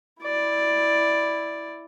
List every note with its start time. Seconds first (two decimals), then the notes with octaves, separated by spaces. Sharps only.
0.23 E4 D5